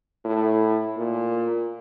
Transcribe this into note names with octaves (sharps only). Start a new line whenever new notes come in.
A2
A#2